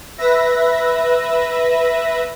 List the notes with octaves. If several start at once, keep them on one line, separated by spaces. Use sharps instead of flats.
B4 E5 A#6